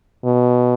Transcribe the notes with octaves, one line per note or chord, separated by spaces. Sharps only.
B2